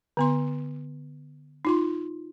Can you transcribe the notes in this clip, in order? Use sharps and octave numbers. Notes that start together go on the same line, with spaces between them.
D3 B3 C6
D#4 F4 C6